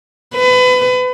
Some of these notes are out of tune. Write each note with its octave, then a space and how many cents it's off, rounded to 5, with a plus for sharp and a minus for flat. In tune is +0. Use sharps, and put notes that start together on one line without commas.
B4 +30